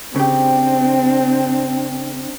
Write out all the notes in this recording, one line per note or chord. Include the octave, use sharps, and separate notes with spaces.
C#3 C4 D4 G4